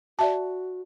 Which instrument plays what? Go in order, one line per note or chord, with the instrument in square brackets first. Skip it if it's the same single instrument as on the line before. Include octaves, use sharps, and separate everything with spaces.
[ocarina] F#4 [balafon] D5 E5 A5